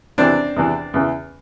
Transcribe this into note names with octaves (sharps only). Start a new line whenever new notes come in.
E2 C3 E3 C4 D4
E2 C3 E3
E2 C#3 E3